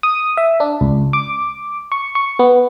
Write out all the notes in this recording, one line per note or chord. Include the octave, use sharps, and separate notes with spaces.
D#6
E5
D4
C#2
D6
C#6
C#6
B3